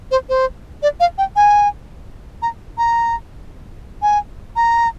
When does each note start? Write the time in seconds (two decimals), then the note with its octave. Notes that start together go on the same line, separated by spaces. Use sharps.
0.11 C5
0.29 C5
0.83 D5
1.00 F5
1.18 G5
1.36 G#5
2.42 A#5
2.78 A#5
4.02 G#5
4.56 A#5